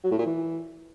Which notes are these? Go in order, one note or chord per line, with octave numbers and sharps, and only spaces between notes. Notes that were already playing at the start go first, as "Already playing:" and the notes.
F#3
A2
A#2
E3